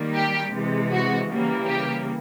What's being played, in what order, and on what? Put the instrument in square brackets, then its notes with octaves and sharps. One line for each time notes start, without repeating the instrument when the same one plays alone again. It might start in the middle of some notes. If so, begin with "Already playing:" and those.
Already playing: [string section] D#3 G3 A#3
G4
C3 E3 G#3
F#4
C#3 E3 G3 A#3
G4